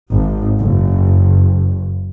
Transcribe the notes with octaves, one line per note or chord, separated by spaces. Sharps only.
G#1
F#1